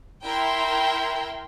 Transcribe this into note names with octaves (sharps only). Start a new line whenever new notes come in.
E4 A#4 G5 C6